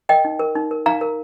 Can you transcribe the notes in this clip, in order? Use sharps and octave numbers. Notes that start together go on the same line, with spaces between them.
A#4 D#5 G5
D#4
A#4
D#4
A#4
D#4 F5 A#5
A#4